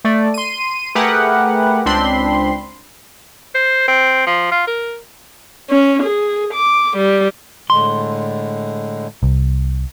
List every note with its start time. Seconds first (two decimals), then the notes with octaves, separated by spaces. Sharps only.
0.05 A3 D5
0.34 C6 D#7
0.95 A3 G4 G#4 A#4 B4 F#5
1.86 C#2 C4 D4 B5 C6
3.54 C5
3.88 C4
4.26 F3
4.52 F4
4.67 A#4
5.70 C#4
6.03 G#4
6.54 D6
6.97 G3
7.70 A2 D3 G#3 C6
9.23 C2